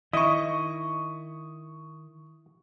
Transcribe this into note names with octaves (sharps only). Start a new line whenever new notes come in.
D#3 E4 D#5 C#6 D#6